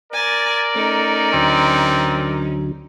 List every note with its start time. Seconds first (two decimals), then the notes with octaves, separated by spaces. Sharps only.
0.13 A#4 D5 G#5 A#5 A6
0.76 A3 C#4 D#4
1.34 D2 D3 F#3 C4